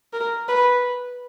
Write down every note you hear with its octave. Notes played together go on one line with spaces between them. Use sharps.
A#4
B4